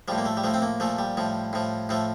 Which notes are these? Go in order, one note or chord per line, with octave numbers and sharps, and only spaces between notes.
A2 F3 G3
A#3
A3
G3
A2 F3 A3
C4
A#3
A#2 F3 A3
G3
A2 F3
A2 F3
A2 F3 A3